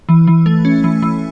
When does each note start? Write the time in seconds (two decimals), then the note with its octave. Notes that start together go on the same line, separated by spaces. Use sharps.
0.09 E3
0.27 E3
0.46 A3
0.65 C#4
0.84 E3
1.02 E3